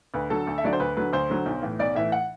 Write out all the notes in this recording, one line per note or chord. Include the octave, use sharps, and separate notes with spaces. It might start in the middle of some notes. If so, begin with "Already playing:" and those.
D2 B4
D3 F#3 A4
D2
E5
D3 F#3 D5
C5
D2 B4
D3 F#3 B4
D2 C5
D3 F#3
B1
A2 E3
B1 D5
A2 E3 E5
F#5